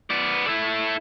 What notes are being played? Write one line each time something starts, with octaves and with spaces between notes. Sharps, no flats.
B3 D5
E4 A4